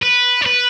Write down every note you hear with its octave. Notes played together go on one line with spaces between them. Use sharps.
B4
C#5
B4